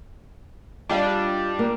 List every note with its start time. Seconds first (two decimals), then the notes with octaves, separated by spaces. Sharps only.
0.89 G3 D4 F4 D#5 F5
1.59 A#3